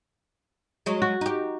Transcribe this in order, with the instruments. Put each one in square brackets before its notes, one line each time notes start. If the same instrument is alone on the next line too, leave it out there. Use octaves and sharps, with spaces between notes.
[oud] F#3 G#3
[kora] F#4
[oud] D#4 G4